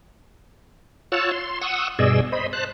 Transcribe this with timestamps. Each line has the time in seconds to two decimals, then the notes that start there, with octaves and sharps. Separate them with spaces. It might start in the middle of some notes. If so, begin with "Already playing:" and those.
1.12 F4 C#5 F#5 A5 E6
1.31 C6
1.62 F#5 C#6 D#6 E6
1.99 G2 B2 G#4 D5 D#5 E6
2.32 C5 D#5 B5
2.53 C5 A5 F#6